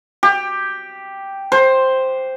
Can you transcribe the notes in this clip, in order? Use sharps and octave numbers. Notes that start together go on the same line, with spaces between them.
G4
C5